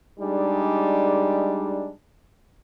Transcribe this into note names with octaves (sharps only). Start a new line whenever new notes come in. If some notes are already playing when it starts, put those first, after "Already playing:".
G3 G#3 D4 D#4 G#4